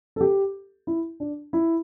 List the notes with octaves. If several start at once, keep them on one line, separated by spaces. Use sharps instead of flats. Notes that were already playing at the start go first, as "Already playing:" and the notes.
A4
G4
E4
D4
E4